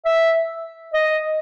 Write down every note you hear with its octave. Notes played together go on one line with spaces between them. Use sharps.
E5
D#5